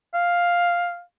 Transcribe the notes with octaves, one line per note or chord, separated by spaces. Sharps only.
F5